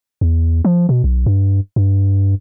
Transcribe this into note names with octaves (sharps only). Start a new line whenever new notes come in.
E2
F3
B2
B1
G2
G2